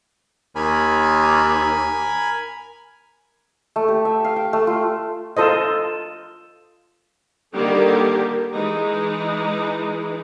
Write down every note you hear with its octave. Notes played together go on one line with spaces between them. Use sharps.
D#2 A#4 G#5 B5
A3
G4
E5
F5
G5
A3
F4
F4 A4 C5 D#5
D3 D#3 G3 A#3 G4 A4
E3 G#3 D#4